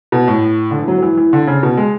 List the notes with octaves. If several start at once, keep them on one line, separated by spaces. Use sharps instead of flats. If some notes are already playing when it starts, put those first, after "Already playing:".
B2
A2
D3
E3
F#3
F#3
E3
E3
D3
C#3
B2
G#3